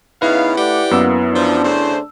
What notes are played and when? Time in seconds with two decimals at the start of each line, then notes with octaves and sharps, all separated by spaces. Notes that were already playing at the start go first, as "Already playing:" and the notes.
0.22 C#3 B3 D#4 E4 B4 F5
0.57 A3 G4 D5 F#5
0.91 F#2 A#3 B3 E6
1.33 F3 D4
1.63 C#3 A3 C5